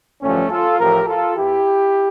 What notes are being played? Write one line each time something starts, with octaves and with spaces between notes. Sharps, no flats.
A1 G2 D3 F3 A3 C#4
F4 A4
A1 A2 F3 G4 A#4
F4 A4
E2 E3 E4 G4